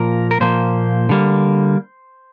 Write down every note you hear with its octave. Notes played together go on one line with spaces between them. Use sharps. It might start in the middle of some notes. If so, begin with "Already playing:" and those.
Already playing: A#2 F3 A#3 A#4
A#4
A#2 F3 A#3 C5
D3 G3 A#3